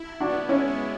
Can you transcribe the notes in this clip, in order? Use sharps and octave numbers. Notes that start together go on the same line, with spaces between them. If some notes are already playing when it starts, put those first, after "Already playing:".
Already playing: E4
E4
D4 F#4
B3
G#3 C#4 E4
E4